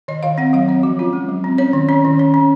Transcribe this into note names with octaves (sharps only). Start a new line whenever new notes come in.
D#3 D#5
D#3 F5
C4 F#5
F#3 F5
C4 C#5
F3 F#4
C#4 F4
G#3
F#3
C4
C#4 C#5
D#3
C#4 C#5
D#3
C#4
C#4